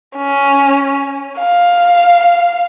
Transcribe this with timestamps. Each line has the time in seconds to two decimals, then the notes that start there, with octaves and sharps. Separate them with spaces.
0.17 C#4
1.39 F5